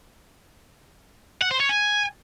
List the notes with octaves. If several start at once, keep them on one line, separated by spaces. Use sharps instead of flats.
F#5
C5
C#5
G#5